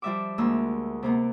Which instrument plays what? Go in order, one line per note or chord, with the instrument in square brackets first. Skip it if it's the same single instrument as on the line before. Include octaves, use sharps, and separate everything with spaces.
[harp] F3 G3 E5 D6
D2 G#3 A#3 E6
C3 A#3 B3